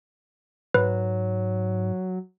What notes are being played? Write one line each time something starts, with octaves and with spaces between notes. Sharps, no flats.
G#2 F#3 B4